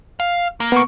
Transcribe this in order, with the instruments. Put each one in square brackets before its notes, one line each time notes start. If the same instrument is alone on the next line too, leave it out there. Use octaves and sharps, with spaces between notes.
[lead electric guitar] F5
A#3
[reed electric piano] B3 C#6